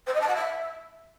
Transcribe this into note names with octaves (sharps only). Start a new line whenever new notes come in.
C5
D#5
A5
F#5
E5